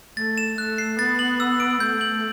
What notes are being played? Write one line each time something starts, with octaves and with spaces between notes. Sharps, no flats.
A3 A6
E7
A3 F#6
C7
B3 A6
F#7
E6
D7
A3 G6
F#7